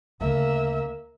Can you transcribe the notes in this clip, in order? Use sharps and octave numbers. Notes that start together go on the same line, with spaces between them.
D2 C#3 A#3 E5